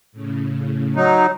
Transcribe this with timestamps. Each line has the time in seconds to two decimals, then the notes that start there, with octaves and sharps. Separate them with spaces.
0.12 A2 C#3
0.96 F#3 D#4